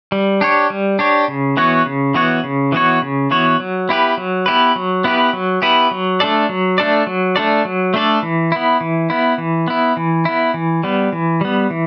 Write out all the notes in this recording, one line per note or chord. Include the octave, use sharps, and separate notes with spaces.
G3
D4 G4 C#5
G3
D4 G4 C#5
C#3
E3 B3 F#4 C#5
C#3
E3 B3 F#4 C#5
C#3
E3 B3 F#4 C#5
C#3
E3 B3 F#4 C#5
F#3
B3 E4 G4 B4
F#3
B3 E4 G4 B4
F#3
B3 E4 G4 B4
F#3
B3 E4 G4 B4
F#3
A3 D4 A4 D5
F#3
A3 D4 A4 D5
F#3
A3 D4 A4 D5
F#3
A3 D4 A4 D5
E3
B3 E4
E3
B3 E4
E3
B3 E4
E3
B3 E4
E3
G3 B3
E3
G3 B3
E3